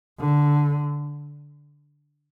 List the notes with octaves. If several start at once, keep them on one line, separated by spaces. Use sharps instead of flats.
D3